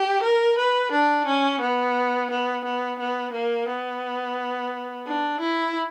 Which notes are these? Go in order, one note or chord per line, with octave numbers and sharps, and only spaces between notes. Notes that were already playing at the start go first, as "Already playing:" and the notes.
Already playing: G4
A#4
B4
D4
C#4
B3
B3
B3
B3
A#3
B3
D4
E4